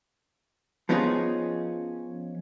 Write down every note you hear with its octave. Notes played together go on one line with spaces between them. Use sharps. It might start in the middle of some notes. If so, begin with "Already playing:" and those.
F3 B3 C#4 D#4 F4 G#4